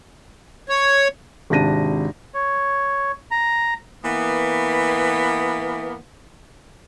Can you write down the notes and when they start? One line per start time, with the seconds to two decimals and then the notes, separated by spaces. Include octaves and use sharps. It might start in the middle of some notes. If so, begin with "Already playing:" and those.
0.69 C#5
1.50 G#1 C3 D4 A#6 D#7
2.34 C#5
3.31 A#5
4.04 E3 A#3 B3